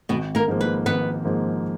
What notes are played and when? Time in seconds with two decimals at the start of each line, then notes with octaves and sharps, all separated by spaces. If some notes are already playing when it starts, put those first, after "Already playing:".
0.09 G#1 B2 B3
0.35 A#3 A#4
0.48 G#2 F3 A#3
0.61 B4
0.86 G#1 B3 B4
1.25 G#2 F3 A#3